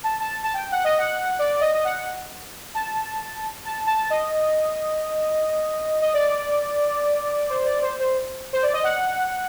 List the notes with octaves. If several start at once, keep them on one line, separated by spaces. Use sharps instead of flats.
A5
A5
A5
G5
F#5
D#5
F#5
D5
D#5
D#5
F#5
A5
A5
A5
D#5
D#5
D5
C5
D5
C5
C5
C5
D5
D#5
F#5